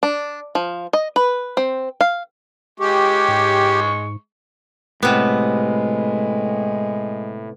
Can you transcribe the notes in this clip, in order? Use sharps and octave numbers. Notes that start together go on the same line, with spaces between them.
D4
F3
D#5
B4
C4
F5
G#3 G4 C#6
G#2
A2 C3 G#3 B3